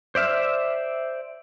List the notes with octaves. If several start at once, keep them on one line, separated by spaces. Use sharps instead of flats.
C5 D5 E5 F6